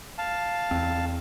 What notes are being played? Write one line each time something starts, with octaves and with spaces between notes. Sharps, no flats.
F5 A5
E2 C4